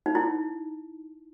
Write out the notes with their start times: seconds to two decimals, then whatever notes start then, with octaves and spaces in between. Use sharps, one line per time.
0.06 D#4
0.15 E4